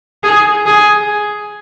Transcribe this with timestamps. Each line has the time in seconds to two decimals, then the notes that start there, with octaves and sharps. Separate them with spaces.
0.24 G#4
0.67 G#4